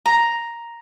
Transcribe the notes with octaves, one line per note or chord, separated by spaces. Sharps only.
A#5